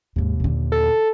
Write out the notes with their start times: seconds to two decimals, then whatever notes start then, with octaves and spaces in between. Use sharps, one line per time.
0.16 D#2 G#2 C3
0.40 A#2 D3
0.72 A4